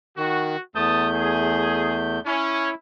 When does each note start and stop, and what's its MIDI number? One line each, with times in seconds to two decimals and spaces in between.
0.17 0.56 51
0.17 0.61 66
0.75 2.20 40
0.75 2.20 57
0.75 1.08 59
0.75 1.08 81
0.75 1.08 87
0.75 2.20 91
1.15 1.97 68
2.26 2.70 61
2.26 2.75 64